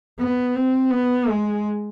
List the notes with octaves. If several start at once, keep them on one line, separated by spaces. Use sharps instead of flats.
B3
C4
B3
G#3